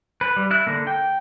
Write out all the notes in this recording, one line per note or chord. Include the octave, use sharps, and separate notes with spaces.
B4
G3
E4 F#6
D3 A#3
G5